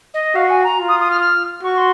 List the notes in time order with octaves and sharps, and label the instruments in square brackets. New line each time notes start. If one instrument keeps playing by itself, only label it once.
[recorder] D#5
[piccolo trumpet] F#4 [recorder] F5
[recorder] G#5
A#5
[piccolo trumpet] F4
[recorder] D#6
D#6
F6
F6
[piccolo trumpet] F#4 [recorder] C#6
[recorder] C6